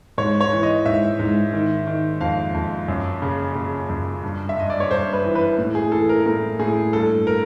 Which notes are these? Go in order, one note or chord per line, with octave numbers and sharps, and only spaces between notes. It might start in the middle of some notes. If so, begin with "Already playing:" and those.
G#2 C#5
C#5
E3
D#5
G#2 E5
G#2
D#3
D#3
F2 F5
F2
F#2
C#3
C#3
F#2
G2
E5
G2 D#5
D5
C#5
G2 C5
B4
E3
B4
A2
G#4
E3 A4
A#4
A2 A#4
A2 G#4
G2 A4
A#4